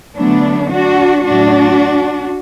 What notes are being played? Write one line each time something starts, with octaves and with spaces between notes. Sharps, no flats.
D3 F#3 A3 B3 D4
D4 F#4
A2 F#3 A3 D4 F#4